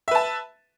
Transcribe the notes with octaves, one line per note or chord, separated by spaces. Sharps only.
B4 E5 A5